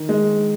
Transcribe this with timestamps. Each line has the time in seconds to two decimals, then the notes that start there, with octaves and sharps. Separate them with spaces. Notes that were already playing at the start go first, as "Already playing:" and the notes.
Already playing: D#3
0.09 G#3